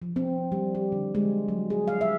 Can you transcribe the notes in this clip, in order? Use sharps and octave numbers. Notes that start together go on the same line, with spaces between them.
F3
C4
G3
G4
D3
G#3
F#3
G#4
F5
E5